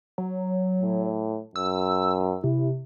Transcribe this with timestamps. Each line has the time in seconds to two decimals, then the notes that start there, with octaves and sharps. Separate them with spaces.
0.18 F#3
0.81 A2
1.56 F#2 E6
2.44 C3 E4